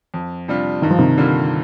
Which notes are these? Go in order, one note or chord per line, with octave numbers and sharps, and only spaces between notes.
F2
C3 G3 D4 F4
G2 D#3
F3
C3 D#3
D3 G3 A#3 F4